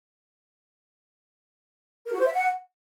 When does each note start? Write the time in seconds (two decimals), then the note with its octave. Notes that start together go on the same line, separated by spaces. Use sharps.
2.06 A#4
2.13 F#4
2.19 C5
2.26 E5
2.33 F#5